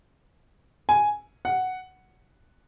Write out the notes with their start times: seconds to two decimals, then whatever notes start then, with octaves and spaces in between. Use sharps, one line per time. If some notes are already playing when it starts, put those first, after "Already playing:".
0.89 G#5
1.45 F#5